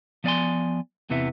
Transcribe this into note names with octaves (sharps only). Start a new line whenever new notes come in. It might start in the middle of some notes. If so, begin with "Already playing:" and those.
F3 B3 D5 D#5 G#5 C6
E2 C3 E3 B3 E5